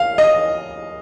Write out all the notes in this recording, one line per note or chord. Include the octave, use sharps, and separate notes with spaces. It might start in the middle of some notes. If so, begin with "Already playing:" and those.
Already playing: F5
D#5